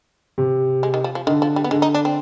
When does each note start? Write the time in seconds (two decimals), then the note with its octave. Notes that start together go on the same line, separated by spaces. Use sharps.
0.38 C3
0.83 G#3
0.94 D#3
1.04 F3
1.15 F3
1.27 D3 D#3
1.42 F3
1.56 G3
1.64 B3
1.71 D3 G#3
1.82 D#4
1.94 D4
2.05 C4